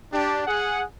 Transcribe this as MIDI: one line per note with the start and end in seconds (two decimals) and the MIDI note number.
0.12 0.43 62
0.12 0.43 67
0.47 0.83 68
0.47 0.83 78